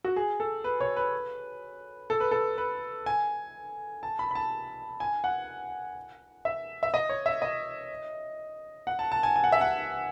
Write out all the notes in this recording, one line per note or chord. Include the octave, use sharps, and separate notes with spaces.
F#4
G#4
A4
B4
C#5
B4
A4
B4
A4
B4
G#5
A5
B5
B5
A5
G#5
F#5
E5
E5
D#5
C#5
E5
D#5
F#5
A5
A5
G#5
G#5
F#5
E5
F#5